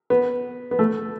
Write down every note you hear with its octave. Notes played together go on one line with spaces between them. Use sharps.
B3
B3
A3